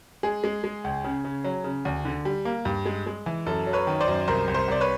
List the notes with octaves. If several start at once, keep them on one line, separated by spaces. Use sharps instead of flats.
G#3 G#4
G#3
G#3
C#2
C#3
C#3
F#3
C#3
D2
D3
G3
A#3
G2
G#3
G#3
E3
F#2 A4
F#3
B4 C#5
D#3
C5 D5
F#2
C2 A#4 C5
C2
A#4 C5
C2 D5
B4 C#5